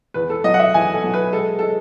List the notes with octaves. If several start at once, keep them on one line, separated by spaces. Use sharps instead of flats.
E2 B4
A4
F#3 D#5
F#5
E5
E2 G#5
A4
F#3
B4
G#3 A4
G#3 A4